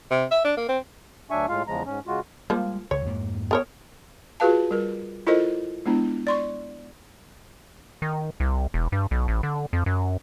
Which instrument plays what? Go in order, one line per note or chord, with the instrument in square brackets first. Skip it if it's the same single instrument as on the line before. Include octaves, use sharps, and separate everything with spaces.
[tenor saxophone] C3
E5
D4
A#3
C4
[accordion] D2 F#3 D4 E5 G#5 C#6
A2 G#3 F4 F5
E2 C#3 F3 G#3 A#5
G#2 C#4
C#3 G#3 F4 F#4
[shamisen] F3 A#3 [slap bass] G3 G#3
[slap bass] C#2 [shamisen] C#5
[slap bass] F2 G#2 A#3
[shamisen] B3 A#4 C#5
[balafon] F4 F#4 G#4 B4 F5 A5
G3 A#4
E4 F4 A4 A#4 C5 D#5
G#3 B3 D4 E4
D5 C6 C#6
[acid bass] D#3
C2
E1
G2
B1
A1
D3
F2
F#2